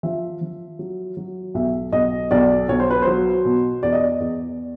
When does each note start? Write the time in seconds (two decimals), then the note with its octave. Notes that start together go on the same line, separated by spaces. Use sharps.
0.03 F3 E5
0.41 F3
0.79 F#3
1.17 F#3
1.54 B1 E5
1.92 B1 D#5
2.31 B1 D5
2.69 B1 C#5
2.80 C5
2.90 B4
3.02 F#3 C5
3.45 B2
3.83 E2 D5
3.92 D#5
4.02 D5
4.20 E2